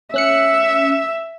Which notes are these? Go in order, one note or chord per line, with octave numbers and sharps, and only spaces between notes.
C#4 E5 F#6 C#7